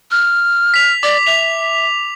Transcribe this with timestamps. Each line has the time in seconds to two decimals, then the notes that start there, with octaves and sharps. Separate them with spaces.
0.11 F6
0.74 B6 F7
1.03 D5 D6
1.26 E5 F7